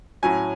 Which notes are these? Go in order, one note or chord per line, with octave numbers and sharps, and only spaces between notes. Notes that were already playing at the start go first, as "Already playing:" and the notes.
A2 F#3 C#4 G#5